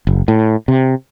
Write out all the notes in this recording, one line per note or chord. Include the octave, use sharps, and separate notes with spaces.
F#1
A2
C3